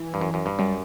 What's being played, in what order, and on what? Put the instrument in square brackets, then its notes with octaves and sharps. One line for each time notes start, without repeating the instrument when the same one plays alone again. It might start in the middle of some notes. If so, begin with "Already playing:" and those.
Already playing: [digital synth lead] E3
[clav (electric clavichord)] G2
F#2
F#2
G2
[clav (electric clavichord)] F#2 [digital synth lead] G3